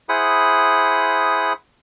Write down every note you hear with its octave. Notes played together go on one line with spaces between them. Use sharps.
E4 G#4 C5 F#5 B5 D#6